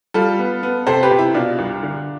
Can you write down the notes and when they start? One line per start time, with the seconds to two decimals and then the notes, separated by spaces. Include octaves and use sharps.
0.14 G3 F4 A4
0.39 B3
0.63 B3
0.87 C3 A4 C5
1.03 G4 B4
1.11 C3
1.19 E4
1.34 B2 D4 F4
1.59 C2
1.83 D3